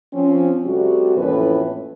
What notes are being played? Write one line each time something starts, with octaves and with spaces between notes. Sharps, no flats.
F3 C4 C#4
C3 G3 A3 F#4
F2 A2 E3 A#3 C#4 B4